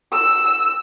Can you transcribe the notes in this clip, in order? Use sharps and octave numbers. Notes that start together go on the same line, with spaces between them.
E6